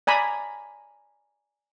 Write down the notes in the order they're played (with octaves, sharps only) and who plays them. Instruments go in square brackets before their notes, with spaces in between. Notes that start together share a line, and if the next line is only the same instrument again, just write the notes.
[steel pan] D5 G#5 A#5 B5